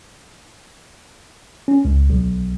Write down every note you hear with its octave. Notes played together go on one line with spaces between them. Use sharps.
C#4
C#2
B1